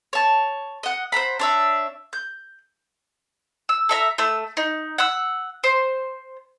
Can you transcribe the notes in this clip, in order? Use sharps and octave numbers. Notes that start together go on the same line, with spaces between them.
C#5 A5
D#5 F#5
C5 F#5 A#5 B5
D4 C#5 E5
G6
E6
A4 E5 A#5
A3 E6
D#4
F#5 E6
C5